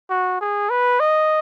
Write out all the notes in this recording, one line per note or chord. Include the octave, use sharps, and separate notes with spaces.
F#4
G#4
B4
D#5